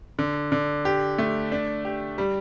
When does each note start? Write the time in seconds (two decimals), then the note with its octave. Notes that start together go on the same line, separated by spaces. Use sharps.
0.19 D3
0.52 D3
0.85 G4
1.18 A3
1.52 D4
1.85 G4
2.18 G3